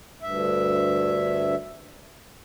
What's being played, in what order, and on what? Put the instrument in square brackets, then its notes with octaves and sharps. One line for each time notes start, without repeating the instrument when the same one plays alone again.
[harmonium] D2 G2 E5